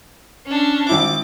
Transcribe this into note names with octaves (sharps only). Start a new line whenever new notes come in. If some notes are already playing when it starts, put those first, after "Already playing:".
C#4 D4
G#1 E4 D6